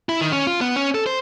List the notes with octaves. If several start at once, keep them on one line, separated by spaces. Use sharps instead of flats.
E4
D#3
C#4
F4
B3
C#4
A4
C5